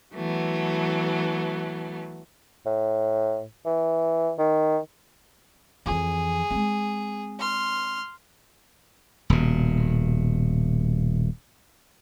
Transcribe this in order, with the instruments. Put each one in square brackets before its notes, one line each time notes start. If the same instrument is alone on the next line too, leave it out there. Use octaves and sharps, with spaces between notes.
[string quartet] E3 F#3 A3 B3
[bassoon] A2
E3
D#3
[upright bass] F2 E3 [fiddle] G#4
[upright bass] G#3 C4
[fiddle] C6 F6
[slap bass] D#1 B2